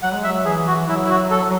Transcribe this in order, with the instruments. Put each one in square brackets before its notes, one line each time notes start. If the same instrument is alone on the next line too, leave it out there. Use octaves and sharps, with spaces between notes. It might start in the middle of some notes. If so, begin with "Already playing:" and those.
[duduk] F#3 [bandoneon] F#5
[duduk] G#3
[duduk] F#3 [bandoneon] E5
[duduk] E3 [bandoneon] G#4
[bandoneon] F#4
[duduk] F#3 [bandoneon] E4
[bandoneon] E4
F#4
A4